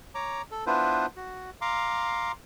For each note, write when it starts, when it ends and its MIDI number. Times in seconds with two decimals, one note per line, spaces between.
0.15 0.42 73
0.15 0.42 82
0.15 0.42 86
0.51 0.65 69
0.67 1.06 59
0.67 1.06 62
0.67 1.06 64
0.67 1.06 65
0.67 1.06 71
0.67 1.06 72
1.16 1.50 66
1.61 2.32 77
1.61 2.32 82
1.61 2.32 84
1.61 2.32 86